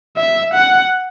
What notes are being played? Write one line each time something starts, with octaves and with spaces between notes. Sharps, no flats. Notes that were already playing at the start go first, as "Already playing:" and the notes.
E5
F#5